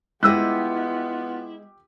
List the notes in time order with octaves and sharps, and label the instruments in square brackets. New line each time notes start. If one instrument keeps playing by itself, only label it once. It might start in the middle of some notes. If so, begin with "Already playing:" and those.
[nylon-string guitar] G#3 D#5 [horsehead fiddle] B3 F4 [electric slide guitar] E4 [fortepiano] G4 E6 F#6